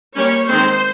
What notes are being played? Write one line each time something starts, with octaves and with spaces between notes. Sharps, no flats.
G3 A#3 C#4 C#5
D#3 G#3 C4 C5